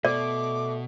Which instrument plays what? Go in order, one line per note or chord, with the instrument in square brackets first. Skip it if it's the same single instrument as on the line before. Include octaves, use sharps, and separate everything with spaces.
[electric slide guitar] B2 [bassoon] A3 [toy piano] D5 [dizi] D6